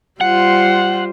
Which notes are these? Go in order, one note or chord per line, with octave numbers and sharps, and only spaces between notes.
G3 F4 C5 F#5